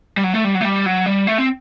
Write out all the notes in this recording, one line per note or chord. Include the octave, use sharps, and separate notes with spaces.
G3
F#3
A3
G3
F#3
A3
G3
F#3
G3
A3
C4